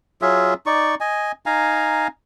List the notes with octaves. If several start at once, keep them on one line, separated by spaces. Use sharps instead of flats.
F#3 F4 G#4 E5
D#4 D5 C#6
D#5 G#5
D#4 F5 G#5 A#5